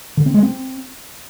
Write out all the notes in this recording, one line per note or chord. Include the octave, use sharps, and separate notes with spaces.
D3
C4
G#3
C4